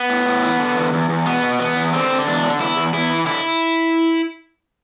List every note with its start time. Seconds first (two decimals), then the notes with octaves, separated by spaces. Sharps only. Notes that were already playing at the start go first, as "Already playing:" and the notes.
Already playing: B3
0.09 A2
0.26 A2
0.43 E3
0.59 D3
0.76 E2
0.93 E2
1.09 E2
1.26 B2 B3
1.43 B2
1.60 E2 B3
1.76 E2
1.93 D3 C4
2.10 D3
2.26 E2 D4
2.44 D3
2.60 E2 E4
2.77 E2
2.93 E2 E4
3.11 E3
3.26 D3 E4